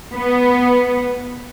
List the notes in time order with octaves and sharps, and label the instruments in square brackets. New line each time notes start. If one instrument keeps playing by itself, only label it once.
[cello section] B3